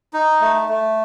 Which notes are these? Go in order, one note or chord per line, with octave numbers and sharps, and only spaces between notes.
D#4
A3
A3